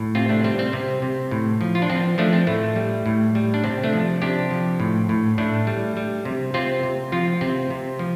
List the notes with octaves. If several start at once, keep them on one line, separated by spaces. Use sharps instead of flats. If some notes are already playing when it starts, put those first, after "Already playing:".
Already playing: A2
C3 C4 F4
A3 D4
G3 C4
C4
C3
C3
A2
F3
F4
D4
F3 C4
F3 A3 D4
C4
A2 A3
G3
A2
G3
D4
C3 C4
A3 D4
F3
C3 D4 G4
F3
A2
A2
A2 A3 D4
G3
G3
C3
C3 C4 F4
C3
F3 C4 F4
C3 C4
C3
F3